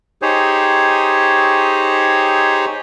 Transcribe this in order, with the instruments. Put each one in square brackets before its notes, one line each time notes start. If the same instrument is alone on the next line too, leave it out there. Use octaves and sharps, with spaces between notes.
[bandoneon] D#4 G4 G#4 C5 C#5